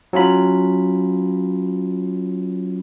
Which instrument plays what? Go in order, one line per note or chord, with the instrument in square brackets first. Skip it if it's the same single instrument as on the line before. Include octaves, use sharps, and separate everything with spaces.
[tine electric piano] F#3 C#4 F4 B5